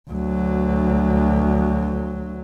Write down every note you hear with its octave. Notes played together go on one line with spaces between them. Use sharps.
D2 F#3